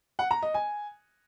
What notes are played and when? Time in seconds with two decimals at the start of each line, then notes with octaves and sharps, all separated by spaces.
0.19 F#5
0.31 A#5
0.43 D#5
0.54 G#5